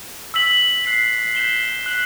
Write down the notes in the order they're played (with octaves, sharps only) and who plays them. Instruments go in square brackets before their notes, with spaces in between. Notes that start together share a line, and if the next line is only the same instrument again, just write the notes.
[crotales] E6 B6 F#7
F#6 C7 F#7
G6 B6 E7 G7
F#6 B6 F#7